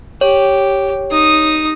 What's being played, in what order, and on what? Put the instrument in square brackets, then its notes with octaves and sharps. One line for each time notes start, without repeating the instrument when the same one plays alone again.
[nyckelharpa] G4 [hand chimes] C#5
[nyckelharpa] D#4 D#6